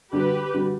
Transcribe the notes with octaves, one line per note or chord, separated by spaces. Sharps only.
D3 G3 D4 F#4 G4 B4
D3 G3 D4 F#4